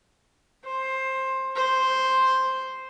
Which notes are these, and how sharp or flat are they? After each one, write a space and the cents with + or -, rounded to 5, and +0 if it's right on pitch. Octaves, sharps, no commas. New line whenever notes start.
C5 +15
C5 +0